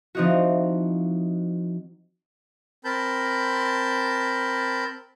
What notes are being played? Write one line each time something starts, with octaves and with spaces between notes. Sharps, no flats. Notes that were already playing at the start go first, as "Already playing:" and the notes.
F3 C4 D#4 E4 F#4
C4 A#4 A5 B5 G6